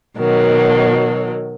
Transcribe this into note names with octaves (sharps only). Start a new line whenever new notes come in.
B2 D#3 F#3